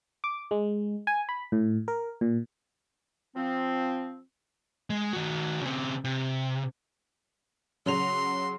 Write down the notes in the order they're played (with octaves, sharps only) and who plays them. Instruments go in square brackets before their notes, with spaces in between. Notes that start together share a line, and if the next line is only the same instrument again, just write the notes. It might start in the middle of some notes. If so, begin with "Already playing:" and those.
[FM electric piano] D6
G#3
G#5
B5
A2
A#4
A#2
[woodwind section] F3 C4
[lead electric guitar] G#3
D#3 F#4
C#3 C4
C3
[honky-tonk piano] C#3 F#3 F7 [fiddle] C6